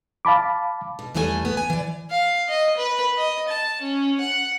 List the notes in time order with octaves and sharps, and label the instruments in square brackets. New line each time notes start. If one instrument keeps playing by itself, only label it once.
[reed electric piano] F5 A5 B5 D6
[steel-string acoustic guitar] B2
E2 E3 G3 A3 D5 G#5
B3
G#5
E3 D5
[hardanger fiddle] F5
D#5
B4
D#5
A5
C#4
F#5